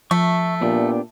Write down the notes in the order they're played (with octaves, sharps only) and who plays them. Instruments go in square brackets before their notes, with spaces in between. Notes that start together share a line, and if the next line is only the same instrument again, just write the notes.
[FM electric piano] F3 [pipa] A3 [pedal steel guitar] E5 C#6
[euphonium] A#2 [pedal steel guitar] B3 D4 G4